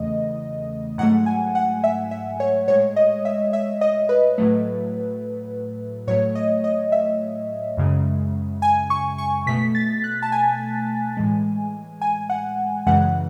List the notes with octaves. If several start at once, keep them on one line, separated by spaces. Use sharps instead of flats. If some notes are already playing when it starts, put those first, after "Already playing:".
Already playing: E2 C#3 E3 A3 D#5
G#2 F#3 A3 F#5
G#5
F#5
E5
E5
C#5
A2 G#3 C#5
D#5
E5
E5
D#5
B4
A2 F#3 A3
A2 F#3 A3 C#5
D#5
D#5
E5
F#2 C#3 G#3
G#5
C#6
C#6
B2 A3 B6
A6
F#6
A5
G#5
A2 E3 G#3
G#5
F#5
F#2 C#3 E3 G#3 F#5